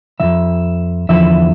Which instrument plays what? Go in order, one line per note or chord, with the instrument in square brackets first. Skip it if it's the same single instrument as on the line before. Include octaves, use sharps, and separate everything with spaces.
[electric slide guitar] E3 E5
F2
E2 D3 F3 E5